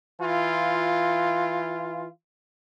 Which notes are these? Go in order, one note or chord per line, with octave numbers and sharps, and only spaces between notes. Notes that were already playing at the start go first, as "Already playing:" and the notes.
E3 F4